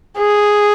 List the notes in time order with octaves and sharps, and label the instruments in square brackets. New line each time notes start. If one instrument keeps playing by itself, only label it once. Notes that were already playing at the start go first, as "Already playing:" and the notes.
[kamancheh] G#4